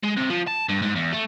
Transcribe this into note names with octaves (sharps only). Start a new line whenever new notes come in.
G#3
C3
F3
A5
G2
G#2
E2
A3